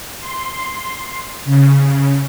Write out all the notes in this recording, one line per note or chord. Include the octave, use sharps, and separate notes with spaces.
C6
C#3